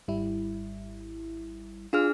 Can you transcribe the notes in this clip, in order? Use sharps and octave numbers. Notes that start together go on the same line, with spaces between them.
G#1 G3 E4
D4 F4 G#4 F6